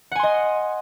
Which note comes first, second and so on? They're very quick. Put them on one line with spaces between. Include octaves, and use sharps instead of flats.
F#5 G#5 C6 D#5